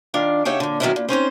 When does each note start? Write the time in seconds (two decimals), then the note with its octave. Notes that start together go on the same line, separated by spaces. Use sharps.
0.14 D#3 D4 F4
0.45 C#3 D#4 G4 C#5 E5 F#5
0.60 A#2 D3
0.80 D#3 F#3 B3 C#4 D#4 E4
0.96 A#2
1.09 C4 C#4 D#4 C5